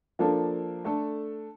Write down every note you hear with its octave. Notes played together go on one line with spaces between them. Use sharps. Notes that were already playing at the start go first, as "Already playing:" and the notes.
F3 A#3 D4 A4
A3 D4 A4